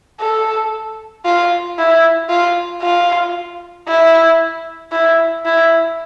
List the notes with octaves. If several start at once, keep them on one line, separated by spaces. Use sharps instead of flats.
A4
F4
E4
F4
F4
E4
E4
E4